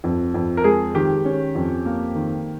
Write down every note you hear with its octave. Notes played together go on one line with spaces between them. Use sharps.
F2
F2
A#4
G#3 G#4
D#3 G4
C#4
F2
A#3
D#3